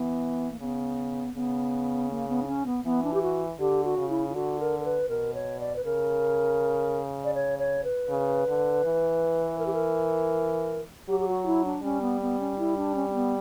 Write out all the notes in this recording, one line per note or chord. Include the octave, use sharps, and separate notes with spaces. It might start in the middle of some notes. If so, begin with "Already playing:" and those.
Already playing: E3 B3
A#3
C#3 B3
C#3 B3
A#3
B3
D4
C#4
B3
E3 B3
D4
G4
F#4
D3 G4
F#4
C#3
E4
E4
D3 F#4
A#4
A#4
B4
B2 A#4
C#5
D5
B4
C#3 A#4
D5
C#5
C#5
B4
C#3
D3
E3
A#4
G4
A#4
F#3 G4
G4
F#4
E4
D4
G3 C#4
B3
B3
C#4
E4
D4
C#4
C#4
B3